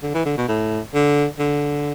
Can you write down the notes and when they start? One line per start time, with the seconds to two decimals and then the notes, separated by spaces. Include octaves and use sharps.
0.02 D3
0.14 E3
0.25 D3
0.37 B2
0.48 A2
0.94 D3
1.39 D3